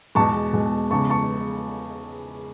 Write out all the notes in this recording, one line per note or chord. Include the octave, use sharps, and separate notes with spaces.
E2 B2 G#3 A5 C#6
E2 B2 G#3
E2 C#3 G#3 A5 C#6
A5 C#6